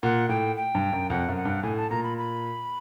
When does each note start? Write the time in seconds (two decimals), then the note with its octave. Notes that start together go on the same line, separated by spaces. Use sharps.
0.03 A#2 F#5
0.29 A2 G5
0.56 G5
0.75 G2
0.92 F#2
1.10 F2 F#5
1.29 F#2
1.36 F#5
1.45 G2
1.63 A2 G#5
1.77 A5
1.90 A#2 A#5
2.03 B5
2.18 B5